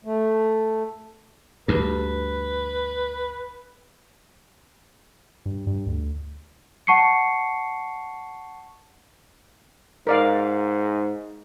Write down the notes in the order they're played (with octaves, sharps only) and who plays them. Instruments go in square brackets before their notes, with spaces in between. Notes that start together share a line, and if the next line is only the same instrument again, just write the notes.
[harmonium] A3
[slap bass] D2 G2 [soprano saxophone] B4
[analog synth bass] G2
G2
D2
[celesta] F#5 A5 C#6 C7 C#7
[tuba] G#2 [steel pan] A#4 D5 F5